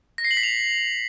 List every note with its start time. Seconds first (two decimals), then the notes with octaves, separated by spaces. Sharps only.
0.18 A#6
0.25 C7
0.31 F#7
0.37 B6
0.43 F7